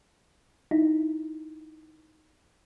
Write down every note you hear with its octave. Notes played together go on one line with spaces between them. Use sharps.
D#4 E4